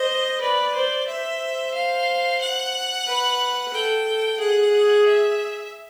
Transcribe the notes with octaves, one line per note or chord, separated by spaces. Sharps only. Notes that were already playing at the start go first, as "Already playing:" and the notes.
Already playing: C5 D#5
B4 D5
C5
C5 E5
F5
F#5
B4
A4 G5
A4
G#4 F#5
E5